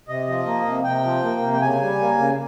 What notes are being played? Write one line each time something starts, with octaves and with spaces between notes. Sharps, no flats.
C3 D#5
F3
A#3
C3
C3 G5
F3
A#3
C3
G5
C#3 G#5
G3
A#3
C#3